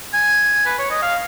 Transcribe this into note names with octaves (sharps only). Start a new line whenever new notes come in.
G#5
B4
C#5
D#5
F5